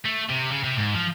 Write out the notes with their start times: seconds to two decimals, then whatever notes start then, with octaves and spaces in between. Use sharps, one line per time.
0.05 A3
0.29 C3
0.52 C#3
0.64 C3
0.78 G#2
0.94 F3